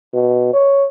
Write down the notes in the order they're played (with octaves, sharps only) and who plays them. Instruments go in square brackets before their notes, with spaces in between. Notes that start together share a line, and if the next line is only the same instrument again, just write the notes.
[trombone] B2
C#5